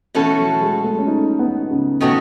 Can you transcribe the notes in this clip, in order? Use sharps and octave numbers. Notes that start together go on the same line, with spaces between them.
B2 E3 A3 C#4 F#4 A4
F#3
G#3
A3
C#4
D#4
B3
C#3
B2 D#3 A3 C#4 F#4